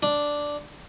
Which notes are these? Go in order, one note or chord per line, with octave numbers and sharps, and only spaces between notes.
D4